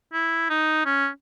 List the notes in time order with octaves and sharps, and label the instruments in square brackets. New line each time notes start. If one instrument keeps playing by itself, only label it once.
[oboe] E4
D#4
C#4